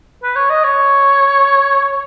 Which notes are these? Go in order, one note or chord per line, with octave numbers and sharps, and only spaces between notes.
B4
C#5
D#5
C#5